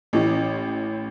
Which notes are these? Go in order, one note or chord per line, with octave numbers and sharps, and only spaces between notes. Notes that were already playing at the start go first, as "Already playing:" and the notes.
A1 A2 E3 C#4